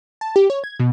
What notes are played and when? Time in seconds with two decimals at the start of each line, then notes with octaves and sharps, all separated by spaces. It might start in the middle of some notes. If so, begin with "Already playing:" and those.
0.21 A5
0.36 G4
0.50 C#5
0.64 G#6
0.80 B2